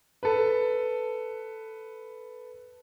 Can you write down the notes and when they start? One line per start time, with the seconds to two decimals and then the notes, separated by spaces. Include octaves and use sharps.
0.23 A4 B4